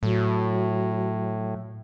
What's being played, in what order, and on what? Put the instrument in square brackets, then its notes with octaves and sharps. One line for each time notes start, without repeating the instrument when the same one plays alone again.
[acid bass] A2 [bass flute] F#3